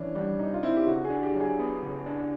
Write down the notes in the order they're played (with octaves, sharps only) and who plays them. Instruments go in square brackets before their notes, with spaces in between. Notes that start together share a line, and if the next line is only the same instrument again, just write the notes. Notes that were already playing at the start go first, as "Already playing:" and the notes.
Already playing: [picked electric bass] E3 [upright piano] C#4 D4
[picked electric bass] G3 [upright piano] D4
[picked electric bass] C3 [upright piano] D#4
[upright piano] F4
[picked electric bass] C4 [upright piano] E4
[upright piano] G4
[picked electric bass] C#3 [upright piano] F#4
[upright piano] G#4
[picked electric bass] D4
[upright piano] G4
[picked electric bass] F#3
[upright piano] G#4
[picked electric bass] B3
C#3
D4